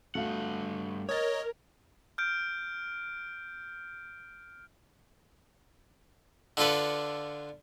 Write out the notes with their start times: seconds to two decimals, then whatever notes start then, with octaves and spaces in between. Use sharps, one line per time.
0.15 G2 A3 F#4 F5 F#5
1.09 A#4 C#5 D#5 D#6 G#6 A6
2.18 F6 G6 D7
6.57 D3 D4 F4 A4 B4